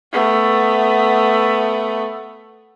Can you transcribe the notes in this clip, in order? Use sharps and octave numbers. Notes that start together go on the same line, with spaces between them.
A3 B3